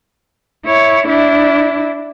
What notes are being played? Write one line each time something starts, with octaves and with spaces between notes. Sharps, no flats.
E4 C#5
D4 E4